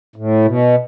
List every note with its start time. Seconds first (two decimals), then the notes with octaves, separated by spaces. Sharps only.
0.16 A2
0.45 B2